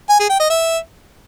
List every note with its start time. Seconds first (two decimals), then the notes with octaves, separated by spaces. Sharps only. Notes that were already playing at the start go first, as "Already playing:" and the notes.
0.10 G#5
0.20 G#4
0.30 G5
0.40 D#5
0.50 E5